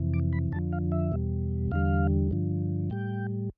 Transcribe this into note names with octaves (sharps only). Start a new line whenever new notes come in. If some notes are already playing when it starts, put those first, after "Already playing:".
Already playing: F2 C3 E3
D6
B5
F2 D3 F3 A5
F5
E5
E2 B2 G3
E2 D3 G3 F5
G2 D3 F3
A2 G3 G5